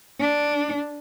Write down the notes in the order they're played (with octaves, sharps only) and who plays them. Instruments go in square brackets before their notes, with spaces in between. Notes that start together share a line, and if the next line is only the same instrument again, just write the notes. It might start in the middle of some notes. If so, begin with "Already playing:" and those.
[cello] D4